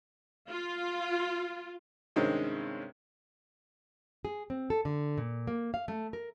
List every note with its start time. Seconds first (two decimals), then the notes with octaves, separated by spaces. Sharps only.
0.48 F4
2.16 G2 C3 D#3 G#3 C4 C#4
4.25 G#4
4.50 C4
4.70 A4
4.85 D3
5.18 A#2
5.48 A#3
5.74 F5
5.88 A3
6.13 A#4